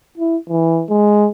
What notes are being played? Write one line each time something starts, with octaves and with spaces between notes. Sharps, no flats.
E4
E3
G#3